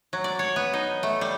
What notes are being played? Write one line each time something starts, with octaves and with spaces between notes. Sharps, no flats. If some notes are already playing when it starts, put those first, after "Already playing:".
F#3
D5
C#5
B3
D#4
A3
G3